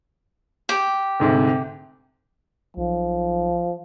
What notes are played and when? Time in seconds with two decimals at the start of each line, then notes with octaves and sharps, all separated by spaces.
0.69 G4
1.20 D2 G#2 C3
2.77 B1 F3